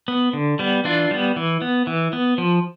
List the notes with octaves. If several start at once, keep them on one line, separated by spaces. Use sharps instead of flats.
B3
D3
G3 B3
E3 D4 F4
G3 B3
E3
B3
E3
B3
F3